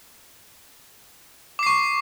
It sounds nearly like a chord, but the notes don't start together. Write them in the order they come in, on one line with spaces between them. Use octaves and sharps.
D6 C7 C#6